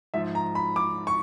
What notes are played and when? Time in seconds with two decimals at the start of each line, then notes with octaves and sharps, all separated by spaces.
0.14 G#2 F3 E5
0.35 A#5
0.55 B5
0.76 D6
1.07 C#6